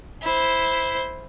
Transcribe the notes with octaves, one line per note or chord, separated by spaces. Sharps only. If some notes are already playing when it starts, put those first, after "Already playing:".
E4 C5